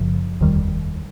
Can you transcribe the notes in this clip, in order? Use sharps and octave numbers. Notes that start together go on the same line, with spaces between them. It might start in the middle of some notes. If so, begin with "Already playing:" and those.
Already playing: F#1 F#2 C#3 F3
F1 D#2 D#3 G3